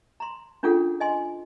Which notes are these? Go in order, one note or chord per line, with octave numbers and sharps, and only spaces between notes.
A#5 C6
C#4 D4 F4 G#4 A4 F#5
D#5 G#5 C6